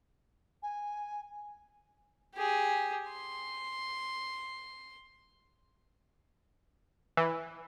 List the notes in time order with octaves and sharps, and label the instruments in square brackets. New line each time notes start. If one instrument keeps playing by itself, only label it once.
[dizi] G#5
[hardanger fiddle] G4 G#4
C6
[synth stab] E3